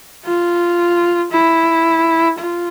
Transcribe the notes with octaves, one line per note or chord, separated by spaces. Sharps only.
F4
E4
F4